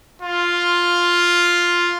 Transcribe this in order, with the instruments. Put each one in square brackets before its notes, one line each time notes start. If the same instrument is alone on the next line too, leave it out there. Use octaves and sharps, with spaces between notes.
[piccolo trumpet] F4